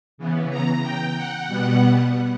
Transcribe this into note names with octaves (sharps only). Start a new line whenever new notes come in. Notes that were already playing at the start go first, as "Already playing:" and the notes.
C#3 E3 B3
A#5
G5
F#5
B2 G3 B3